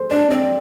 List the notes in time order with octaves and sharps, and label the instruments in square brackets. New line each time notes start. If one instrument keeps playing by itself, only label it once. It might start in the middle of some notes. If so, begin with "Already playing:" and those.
Already playing: [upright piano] A4 C5
[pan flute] D4 [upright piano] D5
[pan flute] C4 [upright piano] D5